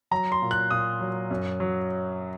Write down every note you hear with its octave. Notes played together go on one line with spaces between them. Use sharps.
F#3 A#5
C6
A#2
F#6
A#2 D#6
F#3
F#2
F#3